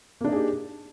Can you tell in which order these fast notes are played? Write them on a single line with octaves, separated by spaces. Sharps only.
A#3 D4 D#4 G#4 G4